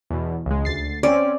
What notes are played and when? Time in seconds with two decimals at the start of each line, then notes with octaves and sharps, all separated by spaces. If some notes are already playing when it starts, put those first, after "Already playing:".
0.10 E2 B2
0.46 C#2 G#3
0.65 D2 A6 C7
1.03 C4 C#4 D5